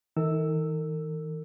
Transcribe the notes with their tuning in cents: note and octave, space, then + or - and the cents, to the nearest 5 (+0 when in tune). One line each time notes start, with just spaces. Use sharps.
D#3 +45 A#4 -45 E6 +0